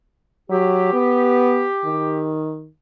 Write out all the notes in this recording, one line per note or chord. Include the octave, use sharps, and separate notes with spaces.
F#3 G4
B3
D#3